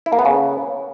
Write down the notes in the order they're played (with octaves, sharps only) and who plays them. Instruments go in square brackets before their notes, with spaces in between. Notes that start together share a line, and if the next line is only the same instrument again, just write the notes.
[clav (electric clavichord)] E4
A#3
B3
C#3